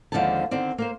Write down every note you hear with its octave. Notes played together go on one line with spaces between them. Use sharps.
D#2 D3 F3 G#3 C4 A5
D3 D#3 C4 D5
A#3 A#4 C5